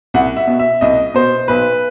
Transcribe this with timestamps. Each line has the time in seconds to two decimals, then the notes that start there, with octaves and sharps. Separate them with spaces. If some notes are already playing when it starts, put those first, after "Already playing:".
0.14 C2 F#5
0.37 E5
0.47 B2
0.59 E5
0.81 C2 D#5
1.14 B2 C5
1.48 B1 B4